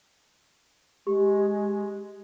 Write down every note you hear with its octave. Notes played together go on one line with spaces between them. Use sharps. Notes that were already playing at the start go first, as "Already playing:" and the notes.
G#3 G4